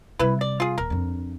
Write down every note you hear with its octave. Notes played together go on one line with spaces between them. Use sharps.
C3 G3 E4 B4
D5
F4 G#4
D#1 A#4
F2 D4